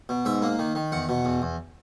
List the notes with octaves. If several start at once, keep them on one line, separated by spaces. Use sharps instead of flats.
B2
G#2 E5
A#3
D#3
D#3
E2 F#5
B2
E2
E2